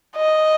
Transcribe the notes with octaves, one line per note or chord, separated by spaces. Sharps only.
D#5